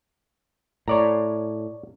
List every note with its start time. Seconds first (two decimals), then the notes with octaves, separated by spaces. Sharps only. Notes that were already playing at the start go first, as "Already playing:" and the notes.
0.88 A2 C#5 D5 A#5